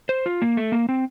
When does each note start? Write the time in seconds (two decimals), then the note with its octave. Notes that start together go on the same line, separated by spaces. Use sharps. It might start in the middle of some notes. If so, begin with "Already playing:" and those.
0.09 C5
0.26 F4
0.42 A#3
0.57 A3
0.72 A#3
0.89 C4